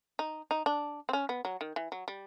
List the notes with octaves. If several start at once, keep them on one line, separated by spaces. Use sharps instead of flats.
D#4
D#4
D4
C4
C#4
B3
F#3
D#3
E3
F#3
G3